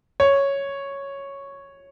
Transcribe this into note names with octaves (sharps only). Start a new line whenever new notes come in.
C#5